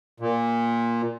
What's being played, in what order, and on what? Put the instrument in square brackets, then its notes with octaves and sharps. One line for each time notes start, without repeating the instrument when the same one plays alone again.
[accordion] A#2